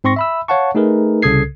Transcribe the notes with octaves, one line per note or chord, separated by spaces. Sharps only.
G#2 C4 C6 C#6 A#6
E5 B5 E6
C#5 F5 F#5 A5 C#6
A3 D#4 G#4 A#4 B4
C2 C#3 A4 D#6 G#6 C7